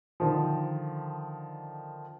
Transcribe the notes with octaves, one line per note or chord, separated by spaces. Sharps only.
D3 D#3 F3